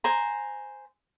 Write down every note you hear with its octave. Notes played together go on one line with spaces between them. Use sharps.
C5 G#5 A#5